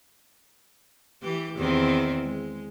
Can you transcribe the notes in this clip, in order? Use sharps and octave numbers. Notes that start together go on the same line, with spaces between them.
E3 G4
E2 D#3 C4
G#3